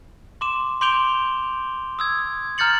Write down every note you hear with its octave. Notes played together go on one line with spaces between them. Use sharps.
C6 D6 E7
C6 D6 G6 D7 F7 G7
D#6 E6 G#6
A#5 F6 G6 A6 C#7 F#7